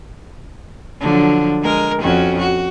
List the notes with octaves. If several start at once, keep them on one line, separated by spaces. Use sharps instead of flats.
D3 F3 F#3
G#3 A#4
F2 C#4 F#4
F#4